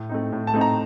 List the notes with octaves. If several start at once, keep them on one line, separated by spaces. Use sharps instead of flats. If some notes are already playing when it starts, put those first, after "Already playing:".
Already playing: A2
A3 C4 D#4
A2
A5
A3 C4 D#4
A#5